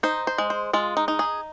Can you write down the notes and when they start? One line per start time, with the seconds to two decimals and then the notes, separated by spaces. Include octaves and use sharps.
0.03 D#4 C5
0.27 C5
0.38 G#3
0.50 C5
0.73 G#3 F4
0.97 D#4
1.08 D#4
1.19 G#4